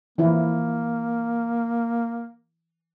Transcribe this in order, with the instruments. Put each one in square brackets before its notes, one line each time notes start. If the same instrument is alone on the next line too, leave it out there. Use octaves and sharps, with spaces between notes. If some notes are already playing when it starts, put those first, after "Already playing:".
[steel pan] E3 F3 E4 [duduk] A#3